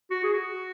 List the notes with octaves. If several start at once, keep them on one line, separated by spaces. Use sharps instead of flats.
F#4
G#4
F#4